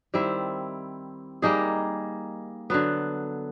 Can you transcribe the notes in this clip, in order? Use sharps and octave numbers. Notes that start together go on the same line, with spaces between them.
D#3 G3 C4 E4
G3 A#3 D#4 G#4
D3 F#3 B3